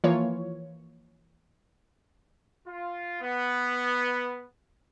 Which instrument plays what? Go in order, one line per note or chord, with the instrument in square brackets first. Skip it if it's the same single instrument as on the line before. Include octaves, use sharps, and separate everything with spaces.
[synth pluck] E3 F3 A#3 F4 C#5
[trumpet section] F4
B3